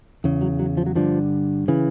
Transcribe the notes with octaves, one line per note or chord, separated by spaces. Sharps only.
E2 C#3
F#3
F#3
F3
F#3
G2 D3 F3
C#3 E3